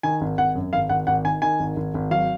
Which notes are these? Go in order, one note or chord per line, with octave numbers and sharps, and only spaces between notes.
D#3 G#5
G#1
G#1 F#5
F#2
G#1 F5
G#1 F#5
G#1 F#5
D#3 G#5
D#3 G#5
G#1
G#1
G#1
F#3 F5